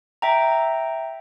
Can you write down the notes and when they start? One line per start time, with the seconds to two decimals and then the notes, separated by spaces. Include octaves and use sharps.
0.22 E5 G5 A#5